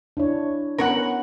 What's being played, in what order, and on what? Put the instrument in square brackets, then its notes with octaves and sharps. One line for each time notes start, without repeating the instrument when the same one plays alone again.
[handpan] D4 E4 C#5
[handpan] B3 C#4 B4 [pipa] A#4 C#5 F#5